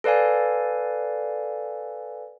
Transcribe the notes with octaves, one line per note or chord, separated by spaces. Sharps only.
A4 B4 D5 F5 G#5